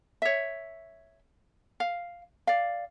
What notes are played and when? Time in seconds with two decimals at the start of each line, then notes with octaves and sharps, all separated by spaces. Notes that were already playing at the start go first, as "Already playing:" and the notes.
0.22 C#5 E5
1.80 F5
2.47 D5 F5